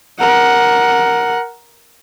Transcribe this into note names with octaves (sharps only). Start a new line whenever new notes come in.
A#4 F#5